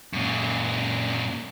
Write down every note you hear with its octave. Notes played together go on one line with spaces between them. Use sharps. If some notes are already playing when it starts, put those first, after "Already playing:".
F#2 A#2